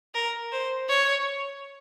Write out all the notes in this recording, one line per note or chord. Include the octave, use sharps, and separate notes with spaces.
A#4
C5
C#5